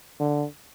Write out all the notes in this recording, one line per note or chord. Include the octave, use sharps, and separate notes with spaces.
D3